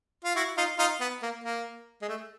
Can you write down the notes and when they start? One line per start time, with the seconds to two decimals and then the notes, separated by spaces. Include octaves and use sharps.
0.25 F4
0.36 E4 F#4
0.57 D#4 F4
0.79 D#4 F4
1.01 B3
1.23 A#3
1.44 A#3
2.02 G#3
2.09 A3